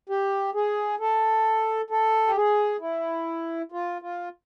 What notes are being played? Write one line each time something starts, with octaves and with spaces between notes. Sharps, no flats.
G4
G#4
A4
A4
G4
G#4
E4
F4
F4